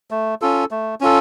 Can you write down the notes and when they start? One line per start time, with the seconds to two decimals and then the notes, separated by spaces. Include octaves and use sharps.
0.11 A3
0.42 C#4 F4 A4
0.71 A3
1.01 C#4 F4 A4